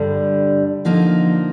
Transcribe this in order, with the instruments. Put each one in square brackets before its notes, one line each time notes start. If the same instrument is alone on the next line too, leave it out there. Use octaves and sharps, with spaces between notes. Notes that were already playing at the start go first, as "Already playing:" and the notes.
Already playing: [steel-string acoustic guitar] G2 D3 G3
D3 F3 A#3 D#4